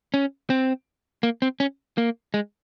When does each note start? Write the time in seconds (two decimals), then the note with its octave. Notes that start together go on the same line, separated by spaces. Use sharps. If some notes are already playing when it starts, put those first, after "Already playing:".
0.14 C#4
0.50 C4
1.23 A#3
1.42 C4
1.60 C#4
1.98 A#3
2.34 G#3